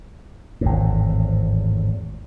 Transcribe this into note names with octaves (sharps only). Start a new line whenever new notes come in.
G#1 E2 A2